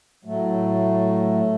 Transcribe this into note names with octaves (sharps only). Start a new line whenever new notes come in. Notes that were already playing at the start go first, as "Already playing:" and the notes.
A2 F#3 A3